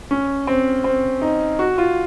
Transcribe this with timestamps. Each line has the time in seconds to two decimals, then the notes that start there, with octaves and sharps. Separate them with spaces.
0.11 C#4
0.47 C4
0.84 C4
1.22 D#4
1.59 F#4
1.78 F4